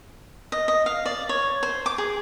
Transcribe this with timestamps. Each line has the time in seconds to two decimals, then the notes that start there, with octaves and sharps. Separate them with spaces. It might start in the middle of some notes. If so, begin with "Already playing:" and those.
0.52 D#5
0.68 D#5
0.86 F5
1.06 D5
1.29 C#5
1.63 C5
1.86 D6
1.98 G#4